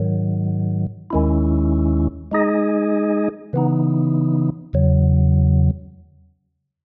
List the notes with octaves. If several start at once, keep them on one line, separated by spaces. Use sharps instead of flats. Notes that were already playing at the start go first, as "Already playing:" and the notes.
Already playing: G#2 D#3 F#3
D#2 D#3 G#3 C#4 E4
G#3 D#4 G#4 D#5
C#3 E3 B3 D#4
E2 C#3 F#3